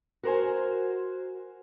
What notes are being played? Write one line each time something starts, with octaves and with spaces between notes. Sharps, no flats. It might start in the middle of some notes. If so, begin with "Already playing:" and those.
F#4 A#4 C5 G#5